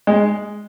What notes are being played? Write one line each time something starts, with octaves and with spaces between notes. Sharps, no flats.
G#3